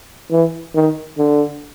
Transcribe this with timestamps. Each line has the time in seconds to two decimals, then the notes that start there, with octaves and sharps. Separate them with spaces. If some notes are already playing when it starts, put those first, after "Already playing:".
0.31 E3
0.75 D#3
1.18 D3